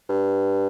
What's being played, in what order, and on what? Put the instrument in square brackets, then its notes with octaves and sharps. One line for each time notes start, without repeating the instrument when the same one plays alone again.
[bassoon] G2